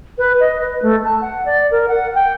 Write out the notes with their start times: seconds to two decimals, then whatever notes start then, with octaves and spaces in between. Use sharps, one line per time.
0.18 B4
0.40 D#5
0.61 B4
0.82 A3
1.04 A5
1.22 F#5
1.46 D5
1.71 A#4
1.88 F#5
2.15 G5